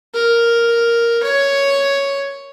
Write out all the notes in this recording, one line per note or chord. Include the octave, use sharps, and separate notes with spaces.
A#4
C#5